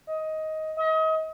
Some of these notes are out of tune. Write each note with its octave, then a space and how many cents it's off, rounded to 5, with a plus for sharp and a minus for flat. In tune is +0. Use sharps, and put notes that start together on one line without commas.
D#5 +15
D#5 +35